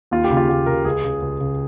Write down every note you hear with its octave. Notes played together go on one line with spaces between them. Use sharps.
D#2 F4
G4
C#3
F4
D#2 G4
C#3 A#4
C#2 G#4
C#3
C#2
C#3